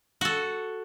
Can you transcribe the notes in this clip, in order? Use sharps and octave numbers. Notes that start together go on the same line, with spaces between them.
F#4 A4